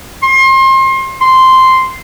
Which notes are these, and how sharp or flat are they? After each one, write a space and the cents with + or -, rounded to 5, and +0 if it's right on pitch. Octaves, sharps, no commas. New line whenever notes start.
C6 +35
C6 -5